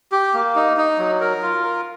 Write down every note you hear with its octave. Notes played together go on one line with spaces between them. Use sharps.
G4
A#3
D#4
D#4
F#3
A#4
F4
A#4